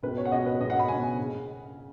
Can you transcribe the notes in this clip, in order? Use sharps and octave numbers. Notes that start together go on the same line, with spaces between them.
C#2 B2 B4
C#5
F#5
C#2 B2 D#5
B4
C#2 B2 D#5
F#5
B5
C#2 B2 G#5
C#3